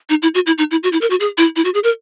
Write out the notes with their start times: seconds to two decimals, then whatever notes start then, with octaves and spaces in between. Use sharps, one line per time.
0.10 D#4
0.22 E4
0.35 F#4
0.46 E4
0.58 D#4
0.71 E4
0.83 F#4
0.92 E4
1.01 A#4
1.10 F#4
1.20 G#4
1.38 E4
1.56 E4
1.65 F#4
1.74 G#4
1.84 A#4